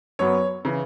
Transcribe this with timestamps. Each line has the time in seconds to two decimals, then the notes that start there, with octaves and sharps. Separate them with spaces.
0.19 F#2 F#3 B3 C#5
0.65 C#3 E3